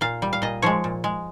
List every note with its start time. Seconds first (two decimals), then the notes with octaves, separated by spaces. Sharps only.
0.01 A#2 F5
0.22 G3
0.33 F5
0.42 A#2 D#5
0.62 F3 G#3 C#5
0.84 A#2
1.04 G#3